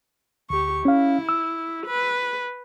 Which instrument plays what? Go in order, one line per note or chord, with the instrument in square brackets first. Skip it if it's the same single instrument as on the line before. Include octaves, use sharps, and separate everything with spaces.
[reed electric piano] D2 [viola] G4 C#6
[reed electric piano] C#4 F5 [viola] E4
[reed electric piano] E6
[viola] B4